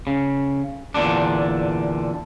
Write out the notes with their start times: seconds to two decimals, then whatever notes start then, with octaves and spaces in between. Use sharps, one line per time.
0.07 C#3
0.94 E2 A#2 D3 D4